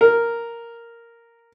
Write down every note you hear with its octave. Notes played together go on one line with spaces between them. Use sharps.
A#4